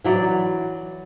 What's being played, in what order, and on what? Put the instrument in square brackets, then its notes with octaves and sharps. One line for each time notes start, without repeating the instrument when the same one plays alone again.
[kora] E3 F#3 D5